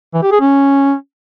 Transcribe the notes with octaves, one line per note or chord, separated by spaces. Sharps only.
E3
G4
G#4
C#4